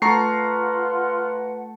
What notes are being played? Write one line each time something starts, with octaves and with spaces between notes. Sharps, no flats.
A3 F4 B4 F#5 A#5 C#6 C7